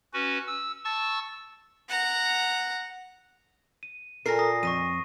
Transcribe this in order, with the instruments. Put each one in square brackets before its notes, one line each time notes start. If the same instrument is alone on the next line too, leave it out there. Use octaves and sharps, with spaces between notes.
[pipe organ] C#4 F#4 B4
E6
A5 C#6 E6 A6
[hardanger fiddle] F#5 A#5
[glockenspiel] D#7
[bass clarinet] A#2 [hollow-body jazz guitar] A4 A#4 [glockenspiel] A#6 C7
[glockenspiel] D#6 A#6
[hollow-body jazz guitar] F2 [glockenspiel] C#6 A#6 D#7